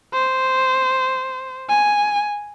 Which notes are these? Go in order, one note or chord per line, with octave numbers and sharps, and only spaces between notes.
C5
G#5